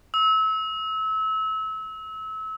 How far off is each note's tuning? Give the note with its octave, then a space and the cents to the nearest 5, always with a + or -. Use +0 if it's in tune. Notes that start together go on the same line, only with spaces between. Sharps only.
E6 -30